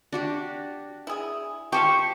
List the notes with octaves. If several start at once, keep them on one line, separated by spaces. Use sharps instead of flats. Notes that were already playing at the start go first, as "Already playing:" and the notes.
D4 F#4 G4
E4 G#4
F3 G4 C5 F5 G5 C#6